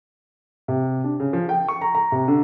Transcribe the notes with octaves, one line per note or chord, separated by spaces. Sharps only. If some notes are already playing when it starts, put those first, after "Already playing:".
C3
D4
C#3
F3
G5
C#6
A#5
A#5
C3
D3